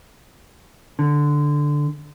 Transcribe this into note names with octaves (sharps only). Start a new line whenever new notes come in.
D3